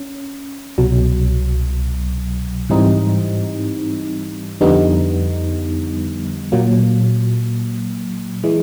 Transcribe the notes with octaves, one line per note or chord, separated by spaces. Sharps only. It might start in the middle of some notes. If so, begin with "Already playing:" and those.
Already playing: C#4
C2 B2 F#3
G#2 E3 G3 C4 D#4
F2 D3 G3 B3 D#4
A#2 F#3 A#3
E3 G#3